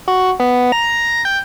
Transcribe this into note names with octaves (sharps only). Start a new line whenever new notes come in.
F#4
B3
A#5
G5